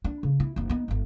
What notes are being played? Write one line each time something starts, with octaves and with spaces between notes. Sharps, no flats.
D4
C#3
E4
F#1 D#4
B3 D#4
G1 G2